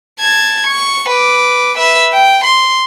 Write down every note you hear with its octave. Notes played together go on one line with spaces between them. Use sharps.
A5 G#6
C#6
B4 D6
B4 E5
G5
C6